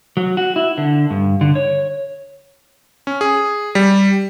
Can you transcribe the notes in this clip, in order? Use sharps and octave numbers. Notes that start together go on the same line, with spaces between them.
F#3
F#4
E4
D3
G2
D3
C#5
C#4
G#4
G3